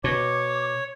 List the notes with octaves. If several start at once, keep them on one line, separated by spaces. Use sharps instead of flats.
B2 C#5 D6